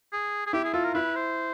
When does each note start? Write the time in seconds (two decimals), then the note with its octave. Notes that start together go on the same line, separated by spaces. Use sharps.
0.12 G#4
0.46 G#4
0.53 E4 G4
0.64 G#4
0.74 F4 A4
0.84 A#4
0.94 E4 B4
1.15 C5